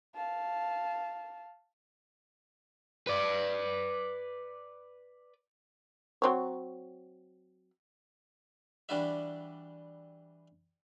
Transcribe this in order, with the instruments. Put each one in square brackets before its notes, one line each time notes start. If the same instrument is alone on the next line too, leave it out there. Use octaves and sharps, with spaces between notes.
[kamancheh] F5 A5
[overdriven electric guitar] B4 D5
[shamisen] F#3 C4 C#5
[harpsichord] E3 G3 D4 E4 F#4 E5